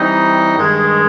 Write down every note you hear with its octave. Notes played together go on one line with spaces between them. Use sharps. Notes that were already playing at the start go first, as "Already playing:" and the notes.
Already playing: E3 G3 C4 D#4
G2 D#3 G#3